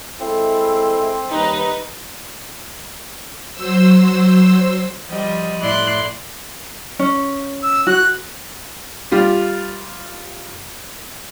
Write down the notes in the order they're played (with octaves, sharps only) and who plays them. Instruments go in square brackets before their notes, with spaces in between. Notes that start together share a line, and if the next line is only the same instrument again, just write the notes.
[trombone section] G#3 E4 A4 [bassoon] C4
[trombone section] D#2 G3 [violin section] D#4 B4
[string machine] F#3 C5 E6
[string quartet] F3 G3 D#5
A2 E4 D5 C6 F#6
[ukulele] C#4
[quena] E6
[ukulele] F#4 [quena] F#6
[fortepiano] G3 F4 G4